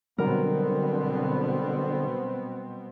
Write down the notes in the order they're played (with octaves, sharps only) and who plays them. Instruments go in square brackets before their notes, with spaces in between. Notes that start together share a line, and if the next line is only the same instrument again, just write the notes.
[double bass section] B2 B3 C4 [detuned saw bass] D3 [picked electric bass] F#3 G3 [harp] A#4